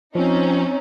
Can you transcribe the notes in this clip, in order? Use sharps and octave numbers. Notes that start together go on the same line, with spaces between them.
F3 C4 C#4 D#4